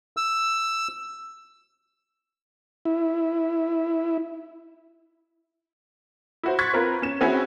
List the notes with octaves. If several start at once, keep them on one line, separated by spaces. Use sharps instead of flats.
E6
E4
E4 F#4 C5
C6 C#6 F#6 G#6 A6 B6
C4 F4 A#4 B4
C#4 E7
C4 C#4 E4 F#4 G#4